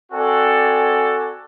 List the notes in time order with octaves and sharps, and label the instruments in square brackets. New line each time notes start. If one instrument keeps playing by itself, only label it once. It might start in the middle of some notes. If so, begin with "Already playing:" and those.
[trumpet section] C4 F#4 A4 D5 G#5